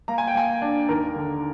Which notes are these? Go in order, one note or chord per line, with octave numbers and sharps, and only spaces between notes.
A#3 A#5
G#5
G5
A#3 G#5
D4
D#2 A#4
D3